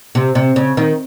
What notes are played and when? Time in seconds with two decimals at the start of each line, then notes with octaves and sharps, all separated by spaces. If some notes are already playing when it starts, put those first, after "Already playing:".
0.15 C3
0.35 C3
0.56 C#3
0.77 D#3